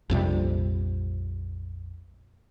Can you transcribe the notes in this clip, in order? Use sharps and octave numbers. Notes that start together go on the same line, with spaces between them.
A#1 F2 C3 G3